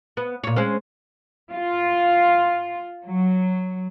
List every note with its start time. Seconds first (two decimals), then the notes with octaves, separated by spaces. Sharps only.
0.17 B3
0.44 A#2 C#5
0.56 G#3 C4 C#4
1.53 F4
3.05 F#3